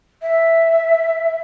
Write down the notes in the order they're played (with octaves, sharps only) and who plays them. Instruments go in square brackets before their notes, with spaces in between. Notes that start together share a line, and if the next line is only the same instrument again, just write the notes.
[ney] E5